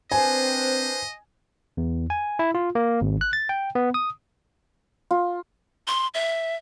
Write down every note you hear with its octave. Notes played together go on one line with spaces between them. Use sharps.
C4 D4 B4 C5 D#5 G#5
E2
G#5
E4
F4
A#3
G#1
F#6
A6
G5
B3
D#6
F4
C6
E5